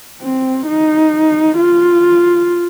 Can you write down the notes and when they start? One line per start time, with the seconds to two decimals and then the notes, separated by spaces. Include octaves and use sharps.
0.22 C4
0.67 D#4
1.58 F4